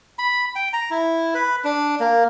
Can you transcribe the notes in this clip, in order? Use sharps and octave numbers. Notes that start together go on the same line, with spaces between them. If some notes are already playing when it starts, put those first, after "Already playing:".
B5
G5
A#5
E4
B4
D4
A#3